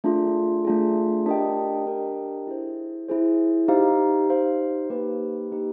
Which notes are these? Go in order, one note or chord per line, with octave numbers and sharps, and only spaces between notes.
A3 D4 F4 G#4
A3 D4 F4 G#4
D4 G4 A#4 D#5 G5
D4 G4 A#4 D#5 G5
E4 G#4 C5
E4 G#4 C5
D#4 G4 C5 F5
D#4 G4 C5 F5
A#3 D#4 G4 B4
A#3 D#4 G4 B4